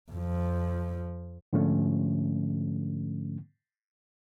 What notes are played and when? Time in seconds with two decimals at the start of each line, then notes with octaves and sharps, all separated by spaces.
0.12 F2 F3
1.53 G#2 D3 F3 A3 C#4